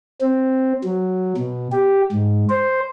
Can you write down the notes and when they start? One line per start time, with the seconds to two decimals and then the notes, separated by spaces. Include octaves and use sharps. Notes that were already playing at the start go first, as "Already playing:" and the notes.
0.21 C4
0.84 F#3
1.37 B2
1.72 G4
2.12 G#2
2.49 C5